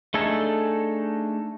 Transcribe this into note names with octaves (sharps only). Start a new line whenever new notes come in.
A3 D4 D#4 G#4 A4